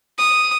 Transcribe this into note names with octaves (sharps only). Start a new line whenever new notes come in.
D#6